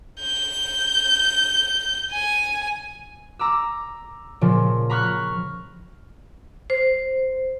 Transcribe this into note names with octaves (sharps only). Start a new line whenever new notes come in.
G6
G#5
A#5 D6 E6
A#2 C#3 F3
A#5 B5 C#6 F6 F#6
C5